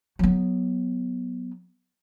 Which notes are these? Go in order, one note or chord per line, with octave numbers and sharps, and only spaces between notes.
F#3 B3